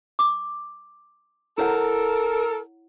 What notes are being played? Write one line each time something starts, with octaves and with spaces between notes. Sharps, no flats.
D6
E4 A4 A#4 C#5 F#5